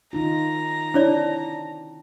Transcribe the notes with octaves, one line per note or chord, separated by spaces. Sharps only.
D#3 D#4 F4 A#5
C4 D4 E4 C#5 D5